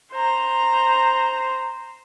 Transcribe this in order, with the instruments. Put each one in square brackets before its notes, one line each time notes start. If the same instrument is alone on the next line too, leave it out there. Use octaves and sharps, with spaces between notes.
[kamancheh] C5 A#5